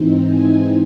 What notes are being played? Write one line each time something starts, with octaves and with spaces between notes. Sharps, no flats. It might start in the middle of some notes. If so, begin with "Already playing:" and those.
Already playing: G#2 E3 C4 D#4
G#5